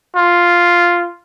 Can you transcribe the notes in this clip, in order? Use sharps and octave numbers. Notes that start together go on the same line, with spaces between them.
F4